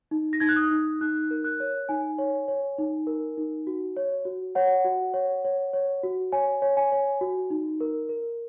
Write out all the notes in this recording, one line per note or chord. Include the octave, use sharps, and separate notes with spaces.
D#4
A#6
D#4 G#6
F#6
D#6
D#4
D#4 F#6
A#4
F#6
C#5
D#4 G#5
C#5
C#5
D#4
A#4
D#4
F#4
C#5
F#4
C#5 F#5
F#4
C#5
C#5
C#5
F#4
C#5 G#5
C#5
G#5
C#5
F#4
D#4
A#4
A#4